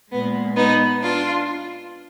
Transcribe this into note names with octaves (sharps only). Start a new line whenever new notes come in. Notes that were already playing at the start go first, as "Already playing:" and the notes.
A#2 G#3 B3
B3 D#4
D4 F4